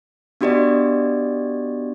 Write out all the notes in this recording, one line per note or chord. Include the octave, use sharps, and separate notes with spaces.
B3 D4 F#4 G4 D5 D#5